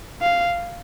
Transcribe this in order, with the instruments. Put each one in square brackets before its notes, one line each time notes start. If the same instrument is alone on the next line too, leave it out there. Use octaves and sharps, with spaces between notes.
[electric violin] F5